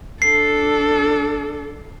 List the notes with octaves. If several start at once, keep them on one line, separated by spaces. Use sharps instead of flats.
D4 A4 C7